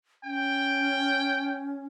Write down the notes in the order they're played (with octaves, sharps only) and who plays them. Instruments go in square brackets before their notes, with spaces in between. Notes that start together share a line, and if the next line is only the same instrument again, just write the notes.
[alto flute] C#4 [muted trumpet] G5